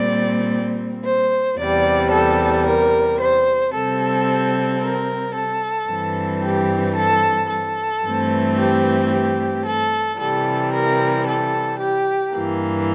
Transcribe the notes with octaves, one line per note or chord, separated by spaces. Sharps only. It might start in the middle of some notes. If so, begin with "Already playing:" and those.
Already playing: A#2 G3 C4 D5
C5
E2 C3 G3 D5
A4
A#4
C5
C3 G3 C4 A4
A#4
A4
G2 E3 G3 C4
G4
A4
A4
G2 E3 A3 C4
G4
G4
A4
C3 E3 G3 A4
A#4
A4
G4
G2 E3 A#3